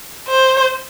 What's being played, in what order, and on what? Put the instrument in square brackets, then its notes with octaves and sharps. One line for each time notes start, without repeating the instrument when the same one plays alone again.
[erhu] C5